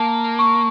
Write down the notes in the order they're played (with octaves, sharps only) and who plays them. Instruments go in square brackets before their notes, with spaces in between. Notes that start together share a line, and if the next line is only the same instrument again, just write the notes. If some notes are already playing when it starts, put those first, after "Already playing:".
Already playing: [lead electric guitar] A#3 [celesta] A5
[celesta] C#6